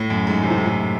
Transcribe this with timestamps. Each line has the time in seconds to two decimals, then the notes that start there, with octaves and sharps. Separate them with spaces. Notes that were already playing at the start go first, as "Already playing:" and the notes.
Already playing: A2
0.10 F#2
0.27 G#2
0.43 C3
0.50 A2
0.58 G#2
0.66 A2